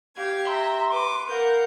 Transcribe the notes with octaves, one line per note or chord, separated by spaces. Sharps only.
G4 F5 G#6
E5 A#5 C6
B4 D6
A#4 F5 F#5 G6